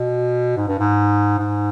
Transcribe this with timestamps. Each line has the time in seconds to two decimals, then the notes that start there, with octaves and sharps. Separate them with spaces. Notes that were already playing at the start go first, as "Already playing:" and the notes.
Already playing: B2
0.57 G#2
0.68 G2
0.79 G#2
1.39 G#2